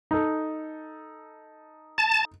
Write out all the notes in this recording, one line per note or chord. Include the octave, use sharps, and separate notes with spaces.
D#4 A4
A5